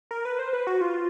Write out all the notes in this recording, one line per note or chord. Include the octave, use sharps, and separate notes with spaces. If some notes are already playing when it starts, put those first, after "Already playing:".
A#4
B4
C5
B4
F#4
F4